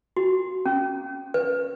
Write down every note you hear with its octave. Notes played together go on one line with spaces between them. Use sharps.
F#4
C#4
B4